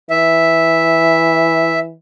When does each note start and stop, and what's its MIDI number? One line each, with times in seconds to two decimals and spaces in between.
0.10 1.95 52
0.10 1.79 76